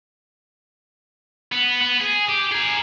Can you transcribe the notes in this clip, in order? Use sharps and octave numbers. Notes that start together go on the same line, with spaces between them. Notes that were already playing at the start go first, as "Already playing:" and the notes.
B3
B3
G#4
G4
G#4 A#4